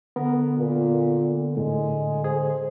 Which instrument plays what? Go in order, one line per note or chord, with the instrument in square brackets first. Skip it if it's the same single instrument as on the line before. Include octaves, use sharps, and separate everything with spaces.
[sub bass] D3 [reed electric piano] B3 A#4
[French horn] A#2
[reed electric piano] A2 [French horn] G#3
[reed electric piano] G#4 [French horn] C5